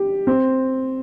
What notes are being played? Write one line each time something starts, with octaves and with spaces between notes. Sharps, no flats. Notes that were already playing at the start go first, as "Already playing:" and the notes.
Already playing: G4
C4